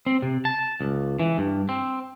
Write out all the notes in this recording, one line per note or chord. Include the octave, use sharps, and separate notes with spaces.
C4
C3
A5
C#2
E3
G2
C4